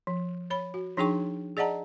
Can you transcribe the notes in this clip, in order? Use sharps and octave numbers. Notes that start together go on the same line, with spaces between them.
F3
C#5 B5
F#4
F3 D4 D#4 G#4 G5 C#6
G#4 D5 D#5 F#5 A5 A#5